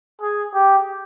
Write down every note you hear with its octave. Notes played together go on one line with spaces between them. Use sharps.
G#4
G4